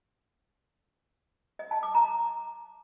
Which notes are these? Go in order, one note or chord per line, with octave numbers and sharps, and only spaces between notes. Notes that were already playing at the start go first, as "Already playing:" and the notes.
D#5
A5
D6
A#5